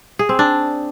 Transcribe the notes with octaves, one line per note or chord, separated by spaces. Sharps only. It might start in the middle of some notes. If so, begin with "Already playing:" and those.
G#4
C4
D4